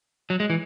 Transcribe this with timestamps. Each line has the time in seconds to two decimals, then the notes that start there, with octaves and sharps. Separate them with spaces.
0.30 F#3
0.40 G#3
0.50 E3